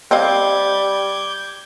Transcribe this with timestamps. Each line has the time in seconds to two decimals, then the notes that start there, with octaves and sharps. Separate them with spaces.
0.11 G3 C4 D#5 F5 D6 G6 G#6